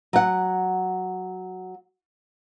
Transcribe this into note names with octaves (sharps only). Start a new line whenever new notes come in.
F#3 F#5